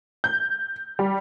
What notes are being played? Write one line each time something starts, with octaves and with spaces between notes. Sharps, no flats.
G6
G3